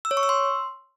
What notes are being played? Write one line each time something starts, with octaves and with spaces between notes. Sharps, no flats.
E6
C#5
C#6
E6
C6